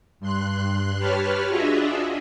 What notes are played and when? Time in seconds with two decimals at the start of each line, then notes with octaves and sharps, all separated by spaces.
0.20 G2 C6 F#6
0.99 G4 B4 C#5 A5 B5 F6
1.48 D4 F4 F#4 G#4 D#5 E5